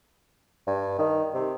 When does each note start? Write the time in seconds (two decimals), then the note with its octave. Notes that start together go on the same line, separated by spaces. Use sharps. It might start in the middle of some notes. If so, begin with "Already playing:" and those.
0.67 G2
0.99 D#3
1.34 C3